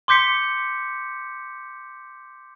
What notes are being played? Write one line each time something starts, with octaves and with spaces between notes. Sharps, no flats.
C6 D6 G6 B6 C#7